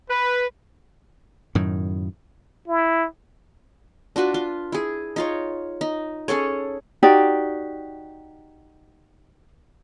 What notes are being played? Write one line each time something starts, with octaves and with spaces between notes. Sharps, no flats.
B4
F#2 A2 D#3
E4
D4 F4 F#4 B4
F4
E4 G#4
D#4 F4 C#5
D#4
C#4 G#4 A4 C#5
D#4 F#4 G4 D5